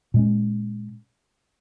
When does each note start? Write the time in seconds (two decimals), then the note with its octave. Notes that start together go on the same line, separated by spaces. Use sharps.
0.14 A#2 G#3 C#4